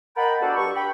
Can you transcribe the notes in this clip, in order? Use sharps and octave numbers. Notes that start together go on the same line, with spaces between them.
A#4 D#5 F#5 G5 A5 B5
B3 D4 F#4 G4 A4
G2 C#6
G5 B5